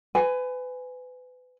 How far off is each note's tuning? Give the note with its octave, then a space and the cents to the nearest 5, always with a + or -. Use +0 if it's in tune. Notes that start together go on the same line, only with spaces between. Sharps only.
B4 +30 G#5 +0